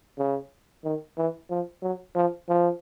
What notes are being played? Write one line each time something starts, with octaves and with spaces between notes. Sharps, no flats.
C#3
D#3
E3
F3
F#3
F3
F3